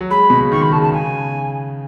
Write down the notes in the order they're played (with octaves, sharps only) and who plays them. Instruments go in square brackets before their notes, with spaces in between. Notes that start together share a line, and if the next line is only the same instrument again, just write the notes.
[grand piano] F#3
[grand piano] G#3 [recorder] B5
[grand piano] B2
C#3
[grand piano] D#3 [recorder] C#6
[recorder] B5
[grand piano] C#3 [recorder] A5
[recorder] A5
[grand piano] C#3 [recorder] G#5